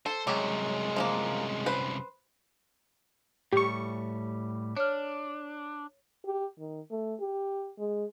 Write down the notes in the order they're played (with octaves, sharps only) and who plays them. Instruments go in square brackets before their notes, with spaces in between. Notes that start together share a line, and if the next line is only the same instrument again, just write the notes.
[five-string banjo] A4 [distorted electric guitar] C5
[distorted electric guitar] C2 F#2 [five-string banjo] F#3 G4 [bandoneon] G#3
[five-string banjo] F3 A3 A#3
B4 C5
[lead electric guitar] A2 G3 [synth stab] G4 C#6
[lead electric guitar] D4 [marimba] C#5 F6
[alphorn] G4
D#3
A3
G4
G#3